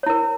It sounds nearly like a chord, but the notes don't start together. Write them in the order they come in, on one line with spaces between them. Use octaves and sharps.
C#5 E4 A#4